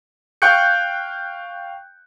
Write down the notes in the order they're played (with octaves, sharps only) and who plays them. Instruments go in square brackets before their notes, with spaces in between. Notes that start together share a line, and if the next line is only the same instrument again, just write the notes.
[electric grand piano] F5 G5 C#6 F#6 G6 C#7